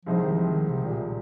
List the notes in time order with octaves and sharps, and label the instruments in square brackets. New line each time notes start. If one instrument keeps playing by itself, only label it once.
[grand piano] C2 C3 G#3 D#4 C5 [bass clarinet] F3
[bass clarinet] D#3
F3
D#3
C3
A#2